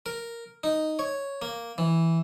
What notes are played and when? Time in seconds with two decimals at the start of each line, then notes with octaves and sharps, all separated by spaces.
0.06 A#4
0.64 D#4
0.99 C#5
1.42 A#3
1.78 E3